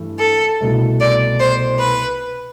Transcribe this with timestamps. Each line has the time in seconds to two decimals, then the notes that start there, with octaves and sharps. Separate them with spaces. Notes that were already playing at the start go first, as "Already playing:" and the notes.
Already playing: G2 E3 A3
0.20 A4
0.61 C2 B2 A3
1.01 D5
1.41 C5
1.81 B4